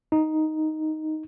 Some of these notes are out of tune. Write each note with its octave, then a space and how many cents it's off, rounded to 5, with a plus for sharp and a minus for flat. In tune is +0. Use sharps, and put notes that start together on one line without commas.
D#4 +0